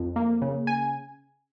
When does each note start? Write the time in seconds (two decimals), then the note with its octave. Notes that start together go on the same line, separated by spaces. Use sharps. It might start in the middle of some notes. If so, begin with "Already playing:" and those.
Already playing: F2
0.16 A#3
0.42 C#3
0.67 G#5